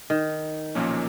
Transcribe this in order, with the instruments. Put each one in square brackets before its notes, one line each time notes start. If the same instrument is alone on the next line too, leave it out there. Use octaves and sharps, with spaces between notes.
[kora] D#3
[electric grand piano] B1 A#2 F3 A#3 C#4